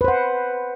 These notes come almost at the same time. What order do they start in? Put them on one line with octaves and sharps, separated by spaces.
B4 C5 F#5